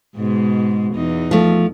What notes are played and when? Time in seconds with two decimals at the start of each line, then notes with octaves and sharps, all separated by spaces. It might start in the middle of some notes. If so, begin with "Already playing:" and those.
0.16 G#2 B2 G#3
0.93 E2 D#4
1.31 F3 A3